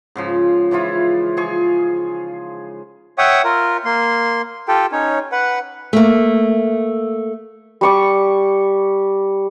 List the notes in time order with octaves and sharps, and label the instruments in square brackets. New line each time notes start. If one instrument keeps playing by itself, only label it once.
[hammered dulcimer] G#2 C#3 F3
E3 F3 E4 F4
F3 G#4 C#6
[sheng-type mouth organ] C#5 E5 F#5 G5 C#6 D#6
F4 A#4
A#3 C6
F4 G4 A4 G5
C#4 D#4 C#5
B4 F#5
[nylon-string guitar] A3 A#3
[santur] G3 C#6 D6